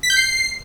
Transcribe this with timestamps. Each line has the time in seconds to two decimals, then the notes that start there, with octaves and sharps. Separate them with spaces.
0.03 B6
0.10 G6
0.17 C7